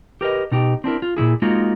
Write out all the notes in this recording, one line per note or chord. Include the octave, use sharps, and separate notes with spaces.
G4 A#4 B4 D#5
B2 D#4 G4
C4 D4 E4 A#4
F4
A#2 C#3 E4 G#4
G#3 A#3 D#4 F4 F#4